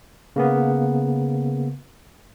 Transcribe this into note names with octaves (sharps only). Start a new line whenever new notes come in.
C#3 A#3 B3